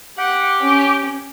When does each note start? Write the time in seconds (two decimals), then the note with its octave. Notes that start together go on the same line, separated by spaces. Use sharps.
0.18 G4 F#5
0.62 C#4